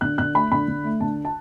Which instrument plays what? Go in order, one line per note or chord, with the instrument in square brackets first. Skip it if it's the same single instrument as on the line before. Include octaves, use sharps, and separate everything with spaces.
[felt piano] D3 F#6
D3 F#6
A3 B5
D3 B5
D3
A3
D3 A5
A5